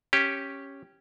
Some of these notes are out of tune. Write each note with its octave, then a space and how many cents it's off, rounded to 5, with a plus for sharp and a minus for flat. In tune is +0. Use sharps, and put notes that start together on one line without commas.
C#4 -5 G4 +0